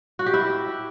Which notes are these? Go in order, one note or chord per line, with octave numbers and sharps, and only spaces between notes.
F#4
G4
E4